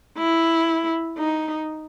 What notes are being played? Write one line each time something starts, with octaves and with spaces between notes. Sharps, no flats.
E4
D#4